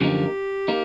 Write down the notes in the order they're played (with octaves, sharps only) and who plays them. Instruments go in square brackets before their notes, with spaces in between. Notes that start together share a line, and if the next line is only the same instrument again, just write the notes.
[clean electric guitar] F#2 D3 F3 A#3 D#4 [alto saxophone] G4
[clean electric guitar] A#3 D#4